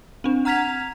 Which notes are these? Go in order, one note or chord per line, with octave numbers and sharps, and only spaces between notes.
C4 D4
F#5 A#5 F6 G#6 B6 F7